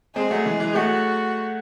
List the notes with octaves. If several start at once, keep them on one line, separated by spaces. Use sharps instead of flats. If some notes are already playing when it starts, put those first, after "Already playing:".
G#3 C4 G#4
F#3 A3
E3 G#3
E3 G#3
F#3 A3 F#4